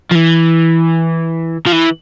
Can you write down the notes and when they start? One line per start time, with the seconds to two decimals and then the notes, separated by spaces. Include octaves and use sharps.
0.11 F3
0.15 E3
1.66 F3
1.72 E3